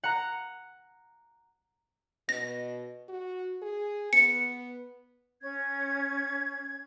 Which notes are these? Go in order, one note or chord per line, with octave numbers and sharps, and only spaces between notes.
F#5 A#5
B2 A#6
F#4
G#4
B3 C#7
C#4 G#6